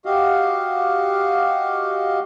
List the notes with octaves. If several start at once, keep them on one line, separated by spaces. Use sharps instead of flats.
F#4 G4 D#5 F5